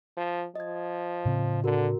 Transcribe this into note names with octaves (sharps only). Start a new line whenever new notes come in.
F3
F3 D#5 G#6
A2 C#3 C4
D3 F#4 A#4